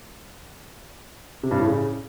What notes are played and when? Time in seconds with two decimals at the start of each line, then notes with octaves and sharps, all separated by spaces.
1.43 C3
1.51 G2
1.59 A2
1.67 C#3